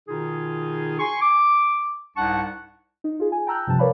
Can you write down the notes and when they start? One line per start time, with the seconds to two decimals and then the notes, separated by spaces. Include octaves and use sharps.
0.08 B2 D#3 D#4 F4 G#4
1.00 G#5 C6 C#6
1.21 D6
2.17 C2 G#2 D4 F#5 A5 C#6
3.04 D#4
3.20 F4 G#4
3.32 G#5
3.47 G5 A5 A#5 E6 F#6 G6
3.67 G2 C3 F3 A5
3.79 A#4 B4 C#5 D5 F5 B5